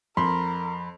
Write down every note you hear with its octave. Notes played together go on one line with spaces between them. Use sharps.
F2 A#4 B5 C6